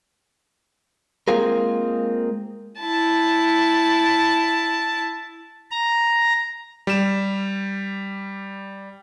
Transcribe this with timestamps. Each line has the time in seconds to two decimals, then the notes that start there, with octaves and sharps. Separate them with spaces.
1.28 G#3 A#3 C4 F4 G#4 A#4
2.80 E4 A5
5.71 A#5
6.87 G3 E7